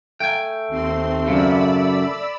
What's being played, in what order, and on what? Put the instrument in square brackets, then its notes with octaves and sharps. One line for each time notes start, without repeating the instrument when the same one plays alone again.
[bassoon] A3 [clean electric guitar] G5 G#5
[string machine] D#2 C4 C6
[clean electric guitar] F#2 A2 C#3 [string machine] D5 B5 E6